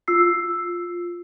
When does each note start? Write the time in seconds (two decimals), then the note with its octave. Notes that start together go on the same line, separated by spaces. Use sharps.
0.08 F4 E6 C7